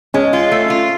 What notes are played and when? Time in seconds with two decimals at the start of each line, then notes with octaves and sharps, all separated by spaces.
0.14 G#3 C#4
0.33 F4
0.52 A3
0.70 F4